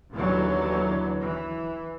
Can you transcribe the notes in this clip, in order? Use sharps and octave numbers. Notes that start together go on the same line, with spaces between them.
D#2 D3 E3 F#3 B3
E3